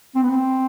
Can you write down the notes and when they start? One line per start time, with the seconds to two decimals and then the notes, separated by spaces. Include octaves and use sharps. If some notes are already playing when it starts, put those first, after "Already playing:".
0.16 C4
0.23 B3
0.31 C4